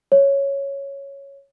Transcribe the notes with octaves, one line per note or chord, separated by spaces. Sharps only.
C#5